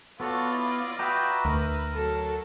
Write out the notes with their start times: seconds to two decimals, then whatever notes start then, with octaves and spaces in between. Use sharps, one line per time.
0.20 B3 F4 F#4 A4 C#5 D5
0.53 E4 D#5
0.99 F#4 B4 D#5 E5 G5 A#5
1.45 D2 A#4 B4
1.94 F#3 A4